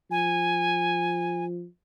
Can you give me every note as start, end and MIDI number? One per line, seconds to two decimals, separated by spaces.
0.11 1.65 53
0.11 1.45 80